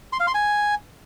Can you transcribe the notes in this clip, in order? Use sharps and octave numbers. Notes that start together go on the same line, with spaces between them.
C6
F5
C6
G#5